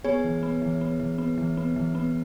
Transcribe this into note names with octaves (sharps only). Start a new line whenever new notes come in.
B3 G#4 C#5
E3
B3
E3
B3
E3
B3
E3
B3
E3
B3